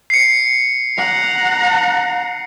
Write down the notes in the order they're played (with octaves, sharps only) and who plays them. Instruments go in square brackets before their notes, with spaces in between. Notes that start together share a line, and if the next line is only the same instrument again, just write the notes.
[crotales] C7 C#7
[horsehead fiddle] F#5 A#5